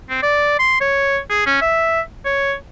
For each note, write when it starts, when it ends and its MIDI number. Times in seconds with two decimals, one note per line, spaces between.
0.09 0.18 60
0.23 0.59 74
0.59 0.76 84
0.81 1.18 73
1.30 1.42 68
1.46 1.59 61
1.61 2.01 76
2.25 2.54 73